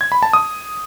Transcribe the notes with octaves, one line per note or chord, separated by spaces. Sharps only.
G#6
B5
A5
D#6